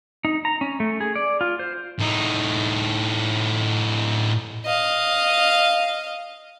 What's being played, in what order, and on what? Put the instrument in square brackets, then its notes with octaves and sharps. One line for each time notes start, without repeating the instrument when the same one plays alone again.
[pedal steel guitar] D#4
A#5
C#4
A3
G#4
D5
F4
C5
[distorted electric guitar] A2 D#4
[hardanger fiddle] D#5 F5